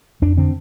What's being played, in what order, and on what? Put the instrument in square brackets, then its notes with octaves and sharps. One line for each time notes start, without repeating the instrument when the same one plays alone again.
[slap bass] F2 D4
D3 C4